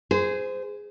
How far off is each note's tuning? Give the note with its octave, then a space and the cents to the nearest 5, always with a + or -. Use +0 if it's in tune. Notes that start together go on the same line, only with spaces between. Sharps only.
G#4 +0 C5 -25